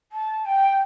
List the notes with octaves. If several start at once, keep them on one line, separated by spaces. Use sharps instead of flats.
A5
G5